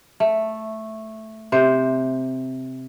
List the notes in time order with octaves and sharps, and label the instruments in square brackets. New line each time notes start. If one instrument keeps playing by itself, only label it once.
[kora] A3
C3 C5